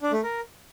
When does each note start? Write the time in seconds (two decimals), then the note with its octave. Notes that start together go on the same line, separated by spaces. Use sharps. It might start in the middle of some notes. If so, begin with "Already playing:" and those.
0.01 D4
0.12 A3
0.23 A#4